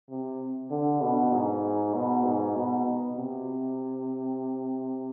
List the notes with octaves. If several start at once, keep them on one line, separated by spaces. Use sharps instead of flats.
C3
D3
B2
G#2
B2
G#2
B2
B2
C3